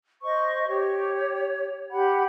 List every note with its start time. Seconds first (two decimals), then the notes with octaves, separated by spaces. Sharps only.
0.23 C5 D#5 C#6
0.67 G4 C#5
1.91 G4 F#5 B5